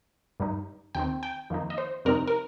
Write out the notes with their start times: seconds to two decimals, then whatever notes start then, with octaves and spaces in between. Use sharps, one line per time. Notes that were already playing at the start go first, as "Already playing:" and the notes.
0.40 G2 G3 D#4
0.95 D#2 D#3 C4 G5
1.23 G5
1.50 F2 D#3 A#3 D#4
1.70 D#5
1.78 C5
2.05 F2 C3 G3 C4 D#4 A#4
2.28 A#4